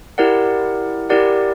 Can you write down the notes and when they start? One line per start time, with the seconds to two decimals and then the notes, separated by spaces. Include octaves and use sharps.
0.18 E4 G4 A#4 D5 F#5
1.10 E4 G4 A#4 D5 F#5